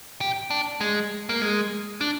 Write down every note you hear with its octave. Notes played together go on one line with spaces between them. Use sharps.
G4
D4
G#3
A#3
G#3
D4